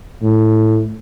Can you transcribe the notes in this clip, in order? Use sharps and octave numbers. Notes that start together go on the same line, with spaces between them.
A2